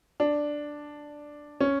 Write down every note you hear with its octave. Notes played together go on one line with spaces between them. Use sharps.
D4
C#4